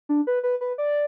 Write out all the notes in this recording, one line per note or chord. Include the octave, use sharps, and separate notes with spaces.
D4
B4
B4
B4
D5